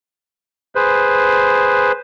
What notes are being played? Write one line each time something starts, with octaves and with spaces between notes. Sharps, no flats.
G#4 B4 C5